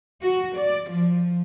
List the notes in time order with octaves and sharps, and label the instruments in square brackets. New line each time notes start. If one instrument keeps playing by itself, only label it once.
[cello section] F#4
D5
F3